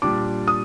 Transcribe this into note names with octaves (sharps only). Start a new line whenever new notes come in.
A#2 G3 D4 D6
D#6